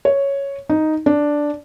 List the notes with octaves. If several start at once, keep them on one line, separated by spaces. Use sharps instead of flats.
C#5
D#4
D4